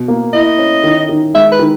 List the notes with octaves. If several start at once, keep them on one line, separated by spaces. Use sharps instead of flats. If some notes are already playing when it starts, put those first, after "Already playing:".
Already playing: B2
A#3
E4 D#5
C#4
D#3
D#3
G#3 E5
B4
D#3